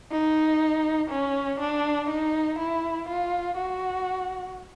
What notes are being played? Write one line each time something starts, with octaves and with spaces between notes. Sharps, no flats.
D#4
C#4
D4
D#4
E4
F4
F#4